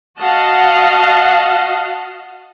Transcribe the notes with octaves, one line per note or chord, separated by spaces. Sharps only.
F#4 D#5 F5 F#5 A5